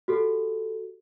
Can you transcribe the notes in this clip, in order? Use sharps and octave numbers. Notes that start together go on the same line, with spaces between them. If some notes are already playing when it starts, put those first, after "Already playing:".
F#4 G4 A4